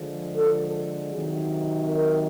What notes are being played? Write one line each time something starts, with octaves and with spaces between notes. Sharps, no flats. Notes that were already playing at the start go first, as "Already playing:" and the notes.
Already playing: D3 F3 G#3
A4
C3 D#3 F#3
A#4